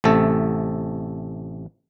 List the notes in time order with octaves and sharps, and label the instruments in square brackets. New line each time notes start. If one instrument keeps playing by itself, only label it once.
[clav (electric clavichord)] A1 C3 A3 A4